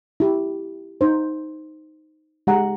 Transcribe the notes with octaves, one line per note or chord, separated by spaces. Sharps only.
E4 G4
D#4 C5
G#3 G4 F#5 A#5